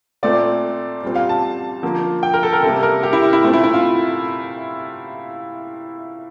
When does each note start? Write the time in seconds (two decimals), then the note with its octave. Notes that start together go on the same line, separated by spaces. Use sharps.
0.23 A#2 A3 C4 D5
1.03 A#2 G3 C4
1.15 F5
1.29 A5
1.83 D3 F3 A#3
2.23 G5
2.33 A#4
2.43 A4
2.53 A#4
2.63 C3 G3 A#3 A4
2.83 A#4
3.03 G4
3.13 E4
3.33 E4
3.43 A#2 A3 C4
3.53 E4
3.64 E4
3.74 F4